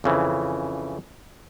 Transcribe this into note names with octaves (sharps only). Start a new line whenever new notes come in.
F2 C#3 E3